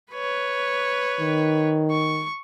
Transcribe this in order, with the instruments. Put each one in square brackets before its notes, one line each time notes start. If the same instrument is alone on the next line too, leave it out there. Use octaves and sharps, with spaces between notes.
[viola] B4 C#5
[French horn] D#3
[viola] C#6